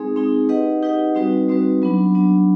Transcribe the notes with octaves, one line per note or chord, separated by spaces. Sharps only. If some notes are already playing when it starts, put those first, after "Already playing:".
Already playing: G#3 C4 D#4 G#4
G#3 C4 D#4 G#4
D#4 G4 B4 D#5 F#5
D#4 G4 B4 D#5 F#5
G3 C4 D#4 F#4 B4
G3 C4 D#4 F#4 B4
F#3 B3 D4
F#3 B3 D4